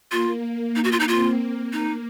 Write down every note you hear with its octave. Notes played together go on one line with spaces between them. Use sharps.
A#3 F4
D#4
F#4
F4
D#4
C4 F4
A#3
A#3 D#4